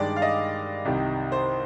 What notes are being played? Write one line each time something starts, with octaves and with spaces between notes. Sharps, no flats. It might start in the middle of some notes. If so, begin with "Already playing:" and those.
Already playing: G2 D#3 G#3 D5
F5
D#5
C2 C3 D#3
C5